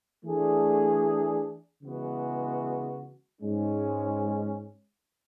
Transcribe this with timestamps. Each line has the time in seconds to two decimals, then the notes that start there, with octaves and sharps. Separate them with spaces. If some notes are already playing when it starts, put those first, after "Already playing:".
0.24 E3 A3 D4 G#4
1.82 C#3 E3 G#3 B3 F#4
3.41 G#2 G#3 C#4